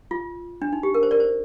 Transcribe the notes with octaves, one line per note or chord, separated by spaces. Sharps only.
F4
D4
D#4
G4
A#4
C5
A#4 D5
C5